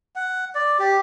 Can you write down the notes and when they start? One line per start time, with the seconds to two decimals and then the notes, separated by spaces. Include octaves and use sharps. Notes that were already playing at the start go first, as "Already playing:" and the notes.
0.16 F#5
0.55 D5
0.79 G4